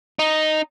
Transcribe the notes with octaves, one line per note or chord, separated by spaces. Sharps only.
D#4